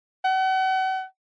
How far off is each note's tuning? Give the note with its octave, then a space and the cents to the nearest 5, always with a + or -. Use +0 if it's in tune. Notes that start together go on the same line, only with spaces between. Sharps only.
F#5 +40